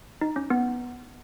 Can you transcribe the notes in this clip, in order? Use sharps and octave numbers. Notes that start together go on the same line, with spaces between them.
D#4
C#4
B3